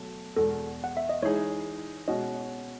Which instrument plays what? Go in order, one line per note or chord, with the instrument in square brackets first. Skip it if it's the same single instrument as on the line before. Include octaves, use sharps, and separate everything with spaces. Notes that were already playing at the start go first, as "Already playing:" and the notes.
Already playing: [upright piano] B2 F#3 A3
[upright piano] E2 B2 G#3 [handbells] A4
[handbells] F#5
E5
D#5
[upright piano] E3 G#3 D#4 G#4 [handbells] C#5
[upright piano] B2 G#3 C#4 F#4 [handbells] D#5